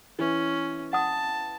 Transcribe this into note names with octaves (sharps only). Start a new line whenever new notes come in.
E3 C#4
F#5 A5 D#6